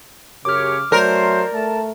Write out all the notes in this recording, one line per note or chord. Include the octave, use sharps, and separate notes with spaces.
F#2 C#3 G4 C#5 D6 F6
F#3 A3 A#4 C5 D5
A3 A5